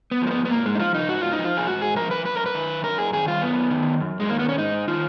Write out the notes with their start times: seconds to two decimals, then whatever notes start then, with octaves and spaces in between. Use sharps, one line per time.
0.11 B3
0.22 F3
0.27 A#3
0.31 B3
0.45 B3
0.50 G#2 A#3
0.66 G#3
0.75 D#4
0.79 F3 F4
0.94 D#4
1.09 G#2 F#4
1.21 F4
1.32 D#4
1.38 F3
1.44 F4
1.57 G#4
1.67 G#2 F#4
1.82 G#4
1.96 F3 A#4
2.11 B4
2.25 F#2 B4
2.35 A#4
2.46 B4
2.54 D#3
2.84 F#2 A#4
2.98 G#4
3.13 D#3 G#4
3.28 F4
3.42 F#2 B3
3.71 D#3
4.00 F#2
4.20 G#3
4.29 D#3 A#3
4.39 B3
4.49 C#4
4.58 G#2 D#4
4.88 D#3 F4